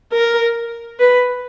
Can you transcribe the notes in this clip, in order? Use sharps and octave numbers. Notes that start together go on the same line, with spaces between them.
A#4
B4